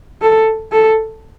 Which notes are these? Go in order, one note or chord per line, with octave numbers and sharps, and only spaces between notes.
A4
A4